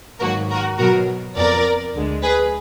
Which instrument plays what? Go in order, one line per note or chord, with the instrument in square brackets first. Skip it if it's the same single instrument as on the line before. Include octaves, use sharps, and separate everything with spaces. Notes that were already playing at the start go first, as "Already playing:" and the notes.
[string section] G#2 D#3 F#3 A#3 F#4 A#4
F#4 A#4
B2 F#3 B3 F#4 A#4
F2 F3 B3 A#4 D5
D2 D3 G#3
G#4 B4